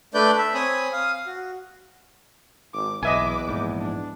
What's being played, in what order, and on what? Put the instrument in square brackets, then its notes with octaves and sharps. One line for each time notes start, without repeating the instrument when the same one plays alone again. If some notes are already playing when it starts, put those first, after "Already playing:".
[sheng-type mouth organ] A3 D4 B4 D5 G6
E5
C4 C#5 G#5 B5 D#6
F5 D#6
F5
F#4
[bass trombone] G#1 [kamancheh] D6
[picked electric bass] B1 [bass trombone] E2 [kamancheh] B4 D6 [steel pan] D#5 E5 G#5
[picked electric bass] A#1 G#2
[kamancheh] D4